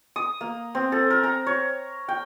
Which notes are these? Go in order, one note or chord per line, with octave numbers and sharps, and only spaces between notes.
D#6
A#3
C4
A4
A#4
A#5
C#5
G5